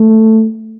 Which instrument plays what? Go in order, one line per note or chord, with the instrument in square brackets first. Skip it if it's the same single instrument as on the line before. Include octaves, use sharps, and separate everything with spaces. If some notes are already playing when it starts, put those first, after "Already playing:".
Already playing: [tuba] A3